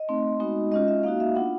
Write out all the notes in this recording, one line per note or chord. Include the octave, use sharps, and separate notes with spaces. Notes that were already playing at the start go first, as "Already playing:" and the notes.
Already playing: D#5
A3 C4 D#4
G#3 B3 D#4 F#4
G#3 C#4 F4 D#5
E5
A#3 D#4 F#4 F5
E5
B3 D4 F4 F#5